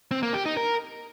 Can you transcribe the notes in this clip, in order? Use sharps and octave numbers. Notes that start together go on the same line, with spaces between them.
C4
A#3
G4
D#4
A#4